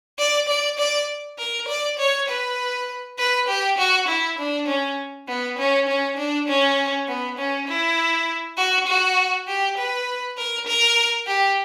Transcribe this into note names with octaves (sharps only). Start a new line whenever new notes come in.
D5
D5
D5
A#4
D5
C#5
B4
B4
G4
F#4
E4
D4
C#4
B3
C#4
C#4
D4
C#4
B3
C#4
E4
F#4
F#4
G4
B4
A#4
A#4
G4